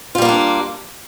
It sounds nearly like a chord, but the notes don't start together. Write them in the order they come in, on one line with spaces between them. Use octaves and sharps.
F4 G3 A#3 B3 D4